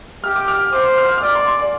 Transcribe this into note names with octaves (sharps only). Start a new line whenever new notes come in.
G4 F6
D6
F6
C5 D6
F6
F6
D5 D6
C6
C6
D5